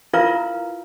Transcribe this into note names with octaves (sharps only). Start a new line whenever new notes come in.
E4 F4 A#4 B4 F5 A#5